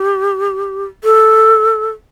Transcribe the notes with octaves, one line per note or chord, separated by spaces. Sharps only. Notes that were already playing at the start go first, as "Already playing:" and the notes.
Already playing: G4
A4